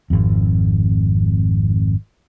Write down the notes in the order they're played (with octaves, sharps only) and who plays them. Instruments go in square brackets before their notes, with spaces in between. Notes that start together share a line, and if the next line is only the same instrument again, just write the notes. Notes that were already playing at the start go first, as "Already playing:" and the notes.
[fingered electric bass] G#1 F2